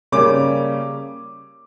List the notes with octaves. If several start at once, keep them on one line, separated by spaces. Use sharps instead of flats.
C#3 G3 A#3 C#4 D6